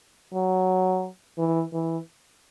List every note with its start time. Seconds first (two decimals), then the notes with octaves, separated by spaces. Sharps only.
0.34 F#3
1.38 E3
1.73 E3